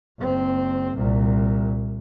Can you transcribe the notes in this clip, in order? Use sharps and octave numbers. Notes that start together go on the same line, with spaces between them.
F#1 C4
C2 A#2